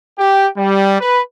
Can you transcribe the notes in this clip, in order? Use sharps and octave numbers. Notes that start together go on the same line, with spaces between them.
G4
G3
B4